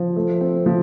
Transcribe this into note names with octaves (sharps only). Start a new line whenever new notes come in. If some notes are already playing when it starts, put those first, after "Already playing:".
Already playing: F3
A3
C4
F3